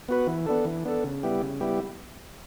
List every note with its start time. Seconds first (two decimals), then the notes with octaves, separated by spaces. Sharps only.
0.09 B3 F#4 B4
0.27 E3
0.46 B3 D4 A4
0.65 E3
0.85 B3 D4 A4
1.04 C#3
1.23 G3 B3 E4 G4
1.41 C#3
1.60 G3 B3 E4 G4